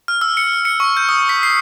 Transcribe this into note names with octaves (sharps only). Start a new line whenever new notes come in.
F6
E6
C#7
C#7
C#6
G6
D#6
B6
C7